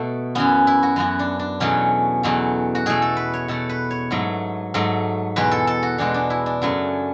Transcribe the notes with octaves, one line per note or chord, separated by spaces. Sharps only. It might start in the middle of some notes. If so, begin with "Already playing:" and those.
Already playing: B2 A3
F#2 E3 B3 C#4
E4
F#4
F#2 E3 B3 F#4
D4
D4
E2 B2 F#3 A3 C#4
E2 B2 F#3 A3
F#4
B2 A3 G#4
A4
B4
C#5
B2 A3 A4
B4
C#5
G#2 F#3 A3
G#2 F#3 A3
E2 B2 G#3 B3 B4
A4
A4
F#4
E2 B2 G#3 B3 D4
D4
E4
D4
F#2 C#3 F#3 A3